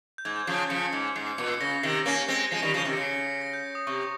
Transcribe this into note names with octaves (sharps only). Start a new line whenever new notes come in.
G6
G#2 G#6
G6
C#3 F3 C7
C7
C#3 F3 C#7
G#2
G#2 C7
C7
A#2 C#7
C7
C#3 A#6
C3 D#3 C7
A#3 C#4 A#6
G#3 C4 A#6
F3 G#3 C7
D#3 G3 A#6
C#3 F3 C7
C3 D#3
C#3 C#7
C7
C#7
A#6
G6
D#6
C3 C#6